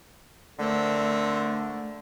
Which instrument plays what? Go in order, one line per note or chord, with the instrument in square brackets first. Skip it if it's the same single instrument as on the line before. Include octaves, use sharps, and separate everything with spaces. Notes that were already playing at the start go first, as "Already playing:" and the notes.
[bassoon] D3 [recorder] A3 [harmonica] C4 A4 A#4